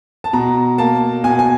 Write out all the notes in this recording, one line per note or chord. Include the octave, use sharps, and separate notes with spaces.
A5
B2 A#5
A#3 A5
B2 G#5
G#5